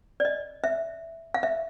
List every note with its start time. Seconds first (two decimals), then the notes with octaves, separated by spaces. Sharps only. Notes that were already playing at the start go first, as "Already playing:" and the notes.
0.20 D5
0.25 D#5
0.64 E5
1.34 F5
1.43 E5